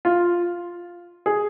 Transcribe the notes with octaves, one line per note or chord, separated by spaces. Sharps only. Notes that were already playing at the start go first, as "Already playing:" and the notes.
F4
G#4